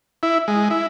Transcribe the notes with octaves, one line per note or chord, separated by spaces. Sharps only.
E4
G#3
E4